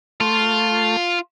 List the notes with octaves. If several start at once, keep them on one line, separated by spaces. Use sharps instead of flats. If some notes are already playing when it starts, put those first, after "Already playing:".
A3 F4